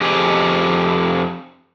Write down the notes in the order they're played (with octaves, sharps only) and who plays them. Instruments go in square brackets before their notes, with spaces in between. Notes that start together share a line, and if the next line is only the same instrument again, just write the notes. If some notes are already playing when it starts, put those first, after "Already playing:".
[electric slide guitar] F2 G4 G#4